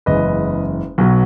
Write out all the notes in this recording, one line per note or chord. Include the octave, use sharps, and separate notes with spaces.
F#1 E2 C#3 G#3 B4 D#5
B1 B2 F#3